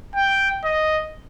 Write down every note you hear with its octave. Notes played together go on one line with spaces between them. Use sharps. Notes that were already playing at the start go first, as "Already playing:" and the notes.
G5
D#5